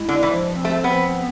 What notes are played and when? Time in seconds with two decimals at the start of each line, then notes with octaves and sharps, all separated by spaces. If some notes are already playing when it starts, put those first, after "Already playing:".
Already playing: G#3 E4
0.09 D3
0.23 E3 F3
0.54 C4
0.65 A3
0.84 F3 B3
1.16 B3